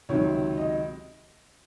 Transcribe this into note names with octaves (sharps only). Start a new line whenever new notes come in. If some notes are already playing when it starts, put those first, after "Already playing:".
C#2 C3 D#3 F#3 C#5
D#5